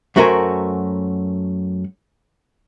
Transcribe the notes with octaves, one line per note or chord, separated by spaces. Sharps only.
F#2 A3 F#4 A#4 C5 G#5